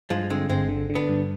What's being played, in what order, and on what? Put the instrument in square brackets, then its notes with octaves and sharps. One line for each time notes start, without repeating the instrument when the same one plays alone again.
[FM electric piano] G2 [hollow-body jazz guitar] F3 G#3
[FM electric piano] D3 [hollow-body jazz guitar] G#3 C4
[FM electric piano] G1 [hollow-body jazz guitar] G#3 C4
[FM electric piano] D3
D3
[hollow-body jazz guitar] B3 D4
[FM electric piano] G2